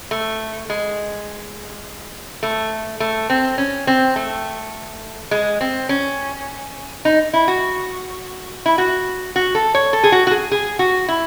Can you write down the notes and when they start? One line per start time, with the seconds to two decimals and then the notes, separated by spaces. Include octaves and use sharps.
0.11 A3
0.70 G#3
2.43 A3
3.00 A3
3.30 C4
3.58 C#4
3.87 C4
4.16 A3
5.31 G#3
5.61 C4
5.89 C#4
7.05 D#4
7.33 E4
7.48 F#4
8.66 E4
8.78 F#4
9.36 F#4
9.55 A4
9.75 C#5
9.93 A4
10.03 G#4
10.12 F#4
10.27 F#4
10.31 G#4
10.51 G#4
10.79 F#4
11.08 E4